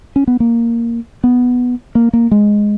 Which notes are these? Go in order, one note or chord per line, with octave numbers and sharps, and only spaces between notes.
C#4
B3
A#3
B3
A#3
A#3
G#3